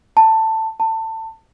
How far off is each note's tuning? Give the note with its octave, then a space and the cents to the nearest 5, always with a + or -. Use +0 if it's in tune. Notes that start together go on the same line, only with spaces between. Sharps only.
A5 +15
A5 +25